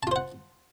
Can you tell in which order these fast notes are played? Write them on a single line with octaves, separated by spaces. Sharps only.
A5 F4 C5 F#5